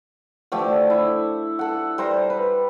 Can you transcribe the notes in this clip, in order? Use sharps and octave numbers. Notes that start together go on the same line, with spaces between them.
D3 F3 A3 G4
E4
A4 F#5
G3 C5 A#5
B4